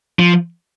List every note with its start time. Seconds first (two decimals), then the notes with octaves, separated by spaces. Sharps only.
0.19 F3